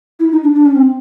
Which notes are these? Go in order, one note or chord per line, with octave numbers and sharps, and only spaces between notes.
E4
D#4
D4
D4
C#4
C4